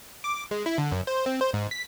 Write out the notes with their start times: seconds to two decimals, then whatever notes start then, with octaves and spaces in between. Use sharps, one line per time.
0.24 D6
0.51 G#3
0.66 E4
0.78 D3
0.92 F#2
1.07 C5
1.26 C4
1.41 C5
1.54 G#2
1.71 B6